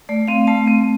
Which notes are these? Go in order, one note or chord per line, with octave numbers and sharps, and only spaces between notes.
A3 D5
C4 F5
A3 A5
C4